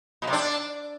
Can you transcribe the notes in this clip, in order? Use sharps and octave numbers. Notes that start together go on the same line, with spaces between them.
B2
C3
D4